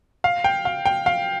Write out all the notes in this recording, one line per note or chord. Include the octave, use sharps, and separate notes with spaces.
F5
G5
F5
G5
F5